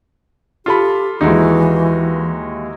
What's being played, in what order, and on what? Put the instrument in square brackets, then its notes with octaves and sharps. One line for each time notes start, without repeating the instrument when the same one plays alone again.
[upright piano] F4 A4 B5 [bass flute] G4
[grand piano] D#2 G#3 [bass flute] E3 [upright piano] D#4 E4 F#4